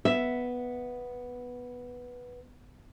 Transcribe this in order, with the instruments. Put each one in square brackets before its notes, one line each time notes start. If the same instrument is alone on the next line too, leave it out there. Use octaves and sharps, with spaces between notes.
[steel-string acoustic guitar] B3 [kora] E5